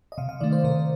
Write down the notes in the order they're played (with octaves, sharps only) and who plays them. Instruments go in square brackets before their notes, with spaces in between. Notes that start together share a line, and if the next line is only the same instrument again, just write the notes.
[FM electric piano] D#5
C3 F5
F5
D#3 A3 D5
C5
C3 A#4